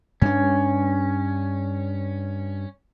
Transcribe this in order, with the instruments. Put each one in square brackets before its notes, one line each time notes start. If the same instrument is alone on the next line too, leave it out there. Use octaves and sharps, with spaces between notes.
[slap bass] G2 D4 [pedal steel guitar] C#4